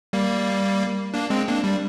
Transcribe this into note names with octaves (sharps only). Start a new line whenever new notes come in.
G3 A#3
A#3 D4
G#3 C4
A#3 D4
G3